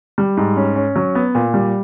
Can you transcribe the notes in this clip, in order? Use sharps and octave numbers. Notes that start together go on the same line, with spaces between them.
G3
G#2
C#4
C#4
F#3
B3
A#2
G3